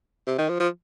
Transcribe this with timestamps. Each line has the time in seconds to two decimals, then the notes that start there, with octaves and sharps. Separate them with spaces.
0.27 C3
0.38 D#3
0.49 F3
0.60 F3